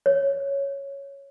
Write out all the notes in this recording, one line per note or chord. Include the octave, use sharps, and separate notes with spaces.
C#5